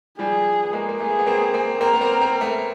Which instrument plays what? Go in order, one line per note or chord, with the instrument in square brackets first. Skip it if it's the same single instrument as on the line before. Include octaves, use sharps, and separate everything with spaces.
[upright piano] F3 G3 [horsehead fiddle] G#4
[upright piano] B3
G#3 A#3
A#3
[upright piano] A3 B3 [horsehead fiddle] G#4
[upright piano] B3
A#3 C4
A#3 C4
[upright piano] A#3 C4 [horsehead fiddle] A#4
[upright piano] B3
A#3 C4
A#3 C4
A3 B3